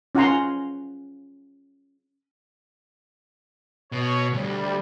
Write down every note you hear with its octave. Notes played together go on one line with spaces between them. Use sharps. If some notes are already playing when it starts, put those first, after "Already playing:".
C#4 F4 F#5 G#5 A#5 C6
B2 C#5
D2 G3